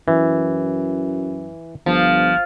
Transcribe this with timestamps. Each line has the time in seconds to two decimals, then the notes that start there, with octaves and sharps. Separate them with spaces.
0.08 F#2 E3
1.86 G1 F3